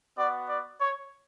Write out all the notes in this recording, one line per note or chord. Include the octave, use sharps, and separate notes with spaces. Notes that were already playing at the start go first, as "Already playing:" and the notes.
B3 F#4 D5
D5
C#5